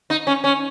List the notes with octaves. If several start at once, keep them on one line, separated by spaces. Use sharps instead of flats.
D#4
C#4
C#4